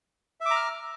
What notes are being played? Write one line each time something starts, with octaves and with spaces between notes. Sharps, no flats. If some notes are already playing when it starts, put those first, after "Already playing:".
E5 A#5 D6 F6